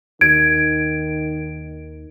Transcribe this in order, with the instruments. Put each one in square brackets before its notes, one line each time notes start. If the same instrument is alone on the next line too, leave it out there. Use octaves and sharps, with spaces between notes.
[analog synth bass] D#2 [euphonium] D#3 [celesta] G#6 [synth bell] D7